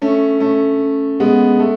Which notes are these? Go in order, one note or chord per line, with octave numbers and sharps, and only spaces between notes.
A3 C#4
A3 C#4
G#3 B3
A3